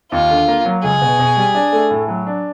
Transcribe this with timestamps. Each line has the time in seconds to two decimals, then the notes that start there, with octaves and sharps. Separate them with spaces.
0.11 D#2 F4
0.30 D3
0.48 A#3
0.65 F#3
0.83 C#2 G#4
1.01 B2
1.19 B2
1.36 G3
1.54 D4
1.73 A3
1.91 A2
2.08 F#3
2.27 D4